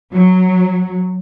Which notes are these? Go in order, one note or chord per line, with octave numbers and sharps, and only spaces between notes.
F#3